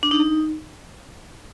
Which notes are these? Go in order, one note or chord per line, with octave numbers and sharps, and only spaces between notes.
D4
D#4